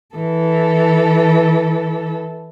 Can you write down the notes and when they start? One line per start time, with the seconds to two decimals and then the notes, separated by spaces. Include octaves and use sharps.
0.15 E3 A4